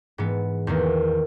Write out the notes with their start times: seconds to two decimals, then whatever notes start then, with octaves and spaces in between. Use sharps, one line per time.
0.18 G#2 E3 B3
0.67 E2 D#3 A#3